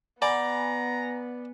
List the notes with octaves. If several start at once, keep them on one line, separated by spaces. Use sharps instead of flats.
B3 D5 F#5 G#5 A#5 B5